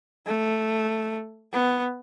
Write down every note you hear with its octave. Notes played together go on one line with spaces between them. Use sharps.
A3
B3